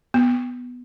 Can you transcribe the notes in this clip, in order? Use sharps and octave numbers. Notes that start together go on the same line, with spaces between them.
B3